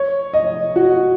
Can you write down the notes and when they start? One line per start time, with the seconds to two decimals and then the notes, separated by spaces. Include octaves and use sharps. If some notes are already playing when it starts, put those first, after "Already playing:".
Already playing: C#5
0.33 D#5
0.76 F#4